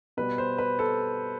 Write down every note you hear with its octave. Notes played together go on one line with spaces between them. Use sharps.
B2 G3 B4
C5
B4
A4